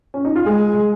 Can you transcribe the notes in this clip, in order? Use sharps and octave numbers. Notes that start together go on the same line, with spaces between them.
C#4
D#4
F4
G#3 G#4